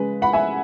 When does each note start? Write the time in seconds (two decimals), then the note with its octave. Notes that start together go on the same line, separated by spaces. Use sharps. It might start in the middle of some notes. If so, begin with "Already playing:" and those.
Already playing: C#3 G#3 B4
0.22 F#5 B5
0.33 E5 G#5